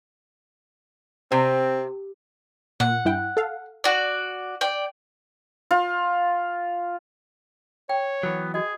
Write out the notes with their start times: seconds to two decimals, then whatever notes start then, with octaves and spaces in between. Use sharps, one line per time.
1.32 C3 C4
2.80 A#2 F#5
3.05 G2 E4 G5
3.37 A4 F5
3.84 F#4 D5
4.61 D5 G5
5.71 F4
7.89 C#5 G5
8.23 E3 F#3 B3
8.54 F#4 G#4 D#5